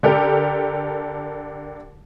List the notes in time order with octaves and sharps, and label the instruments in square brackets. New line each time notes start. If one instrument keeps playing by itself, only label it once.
[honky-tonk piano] D3 G4 A4 A#4